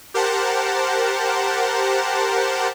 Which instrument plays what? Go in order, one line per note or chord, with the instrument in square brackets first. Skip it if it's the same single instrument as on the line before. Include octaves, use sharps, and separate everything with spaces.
[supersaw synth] G4 A#4 C5 F#5 A5